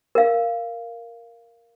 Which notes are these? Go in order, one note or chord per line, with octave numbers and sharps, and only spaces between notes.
A#4 F5